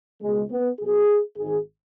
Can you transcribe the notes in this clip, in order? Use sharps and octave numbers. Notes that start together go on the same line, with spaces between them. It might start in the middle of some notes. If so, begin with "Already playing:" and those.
C#2 B2 G#3
B3
B1 B2 G#4
G#1 G#2 D#3 G#4